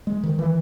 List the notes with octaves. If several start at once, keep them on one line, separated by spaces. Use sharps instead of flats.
G#3
D#3
E3